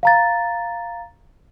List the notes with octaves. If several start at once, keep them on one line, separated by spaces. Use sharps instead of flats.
F5 A#5 A6